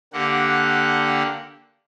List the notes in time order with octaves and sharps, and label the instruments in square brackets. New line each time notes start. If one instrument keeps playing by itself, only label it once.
[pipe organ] D3 A#3 G4 F#5